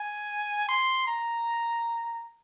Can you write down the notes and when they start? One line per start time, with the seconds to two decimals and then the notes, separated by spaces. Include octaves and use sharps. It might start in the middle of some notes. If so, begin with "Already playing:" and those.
Already playing: G#5
0.69 C6
1.07 A#5